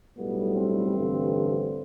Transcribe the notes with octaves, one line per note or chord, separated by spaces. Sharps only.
B1 A2 G3 B3
C4
A1 G2 D3